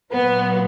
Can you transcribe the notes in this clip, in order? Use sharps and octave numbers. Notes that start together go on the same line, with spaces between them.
A#2 F#3 B3